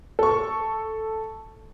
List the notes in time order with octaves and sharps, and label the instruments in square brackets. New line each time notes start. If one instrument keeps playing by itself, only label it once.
[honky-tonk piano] A4 C#6